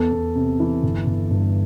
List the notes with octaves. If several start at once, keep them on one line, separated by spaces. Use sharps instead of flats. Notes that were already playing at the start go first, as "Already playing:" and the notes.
Already playing: E2 A4
E2
C3
E3
G1
G1
G2